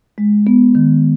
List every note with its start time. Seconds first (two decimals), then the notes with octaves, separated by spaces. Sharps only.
0.18 G#3
0.47 B3
0.75 D#3